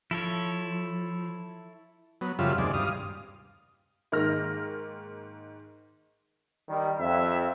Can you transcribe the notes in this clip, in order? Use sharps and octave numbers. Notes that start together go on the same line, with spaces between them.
F3 E4 A4 C#5
F#3 B3
F#2 C#3 F3 G3 F4 E5
D#2 C3 G#3 D5
G2 F5 D#6
G#2 D#3 A#3 F6 A#6
D#3 G3
F2 E5